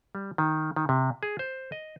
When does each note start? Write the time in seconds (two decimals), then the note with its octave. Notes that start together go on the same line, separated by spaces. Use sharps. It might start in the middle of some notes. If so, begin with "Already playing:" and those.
0.15 G3
0.38 D#3
0.76 D#3
0.89 C3
1.23 G#4
1.39 C5
1.72 D#5